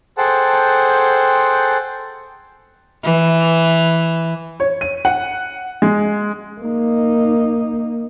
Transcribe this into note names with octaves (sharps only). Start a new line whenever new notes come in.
G#4 A4 C5 F#5 G5 A5
E3
C#5
D#7
F#5
G#3
A#3 D#4